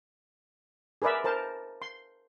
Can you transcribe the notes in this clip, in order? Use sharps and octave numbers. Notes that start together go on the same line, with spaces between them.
G#4 A#4 B4 D5 E5
A#4 C5 A5
C6